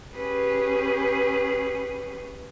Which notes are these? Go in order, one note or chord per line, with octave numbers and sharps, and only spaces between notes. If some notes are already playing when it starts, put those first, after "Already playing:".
C#4 G4 G#4 B4